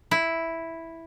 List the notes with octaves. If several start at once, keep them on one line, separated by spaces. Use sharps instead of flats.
E4